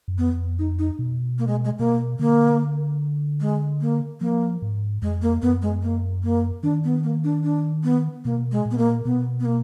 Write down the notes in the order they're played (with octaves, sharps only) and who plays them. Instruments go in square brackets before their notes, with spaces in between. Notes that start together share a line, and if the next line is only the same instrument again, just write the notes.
[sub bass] F#2
[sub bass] F2 [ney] B3
[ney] D#4
D#4
[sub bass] B2
[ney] A#3
G#3
G#3
[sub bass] B2 [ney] A#3
[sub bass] D3 [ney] A#3
[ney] G#3
A#3
[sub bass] F3 [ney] A#3
[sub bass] G#2
[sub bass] F2 [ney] G#3
[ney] A#3
[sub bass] F#2 [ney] B3
[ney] G#3
A#3
A#3
[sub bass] D#3 [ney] D4
[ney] B3
A#3
D4
D4
B3
[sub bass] B2 [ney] A#3
[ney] G#3
[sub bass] A#2
[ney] B3
A#3
[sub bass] B2 [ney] B3
[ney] B3
A#3